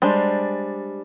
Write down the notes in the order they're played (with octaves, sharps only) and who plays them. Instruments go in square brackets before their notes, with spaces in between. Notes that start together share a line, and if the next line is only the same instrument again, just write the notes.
[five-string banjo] G3 G#3 D4 C5